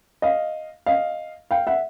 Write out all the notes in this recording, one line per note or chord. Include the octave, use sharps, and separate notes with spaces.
D#5 F5
D#5 F5
F5 G5
E5 F#5